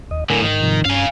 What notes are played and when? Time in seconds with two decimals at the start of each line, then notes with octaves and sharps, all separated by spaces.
0.11 D#2 D#5
0.30 A2 D3 A#4 G#5
0.43 G#2 D#3
0.62 G#2 C3 F3
0.85 G2 C#4 F5 G#5